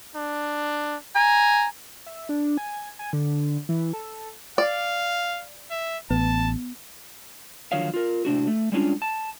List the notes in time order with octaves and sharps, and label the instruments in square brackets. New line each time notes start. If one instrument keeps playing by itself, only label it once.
[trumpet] D4
[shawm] G#5 [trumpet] A#5
[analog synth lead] E5
D4
G#5
G#5
D3
E3
A4
[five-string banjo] D5 [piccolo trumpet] F5
[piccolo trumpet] E5
[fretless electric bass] A1 [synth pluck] B3 [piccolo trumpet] A5
[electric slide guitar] D3 D#3 F3 F#3 C#5 F5
F4 A#4
A2 C3 D4 F#4
A3
G3 G#3 C#4 D4 F4
A5